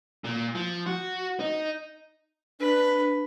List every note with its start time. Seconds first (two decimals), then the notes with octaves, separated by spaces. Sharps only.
0.24 A#2
0.55 F3
0.86 F#4
1.40 D#4
2.60 D4 B4